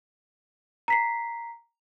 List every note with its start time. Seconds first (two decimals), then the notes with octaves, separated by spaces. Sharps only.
0.88 A#5 B6 C7